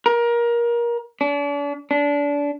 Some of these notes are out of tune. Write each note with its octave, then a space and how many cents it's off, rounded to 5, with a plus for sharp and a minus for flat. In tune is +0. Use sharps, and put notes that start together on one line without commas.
A#4 +25
D4 -40
D4 -25